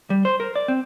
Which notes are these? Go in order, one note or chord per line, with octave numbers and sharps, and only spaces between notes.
G3
C5
A#4
D5
C4